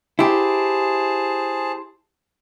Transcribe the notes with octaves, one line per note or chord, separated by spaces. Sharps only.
E4 G4 G#4 C5 A5